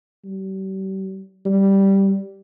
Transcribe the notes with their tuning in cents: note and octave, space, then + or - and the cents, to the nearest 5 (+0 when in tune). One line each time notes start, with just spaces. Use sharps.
G3 -40
G3 -5